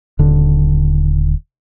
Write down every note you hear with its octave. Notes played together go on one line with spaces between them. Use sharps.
D#1 D3